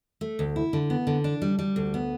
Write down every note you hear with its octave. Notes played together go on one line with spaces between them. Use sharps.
A3
D2
E4
D3
B3
D3
D4
G3
G3
D2
B3